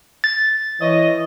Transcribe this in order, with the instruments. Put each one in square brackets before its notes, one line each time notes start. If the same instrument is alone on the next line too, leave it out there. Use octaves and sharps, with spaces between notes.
[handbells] A6
[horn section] E3 C#5 D#5